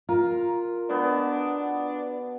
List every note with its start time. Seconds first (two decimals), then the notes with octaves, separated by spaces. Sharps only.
0.09 F4 A#4
0.90 B2 B3 D4